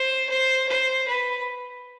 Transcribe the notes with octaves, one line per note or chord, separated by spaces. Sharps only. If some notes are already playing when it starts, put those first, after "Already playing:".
Already playing: C5
C5
C5
B4